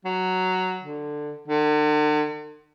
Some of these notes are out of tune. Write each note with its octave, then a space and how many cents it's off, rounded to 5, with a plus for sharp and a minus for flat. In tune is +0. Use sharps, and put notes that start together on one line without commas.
F#3 +5
D3 +15
D3 +45